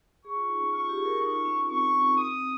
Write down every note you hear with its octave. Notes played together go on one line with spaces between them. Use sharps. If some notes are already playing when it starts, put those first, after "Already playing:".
G#4 C#6
F4
D#4
C#4
F4 C#6
G4
G#4
A#4
D#4 C#6
F4
C#4
F4
C4 C#6
C4
C4 D#6